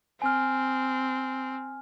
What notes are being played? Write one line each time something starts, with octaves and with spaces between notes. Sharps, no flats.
C4 G#5 F6